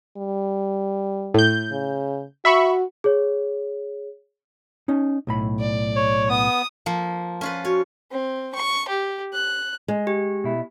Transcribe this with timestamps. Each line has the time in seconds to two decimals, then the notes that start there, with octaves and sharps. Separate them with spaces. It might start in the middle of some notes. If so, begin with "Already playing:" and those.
0.17 G3
1.34 A2 G6
1.72 C#3
2.45 F#4 E5 B5 C#6
3.04 G#4 C#5
4.88 C#4 D#4
5.27 B1 A2 B5
5.60 D5
5.96 C#5
6.30 B3 D#6
6.86 F3 A#3
7.41 C#4 F4 B4
7.65 F#4 C#5
8.11 C4
8.55 C#6
8.88 G4
9.33 F#6
9.88 G#3
10.07 G4
10.44 B2 E4